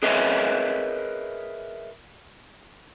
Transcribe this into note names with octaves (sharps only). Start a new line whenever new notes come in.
G#4 A#4 B4 C#5 D#5 E5